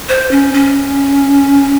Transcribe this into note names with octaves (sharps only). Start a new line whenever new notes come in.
C5
C#4
C#4